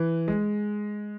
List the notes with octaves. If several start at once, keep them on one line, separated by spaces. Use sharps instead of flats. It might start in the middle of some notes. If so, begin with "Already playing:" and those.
Already playing: E3
G#3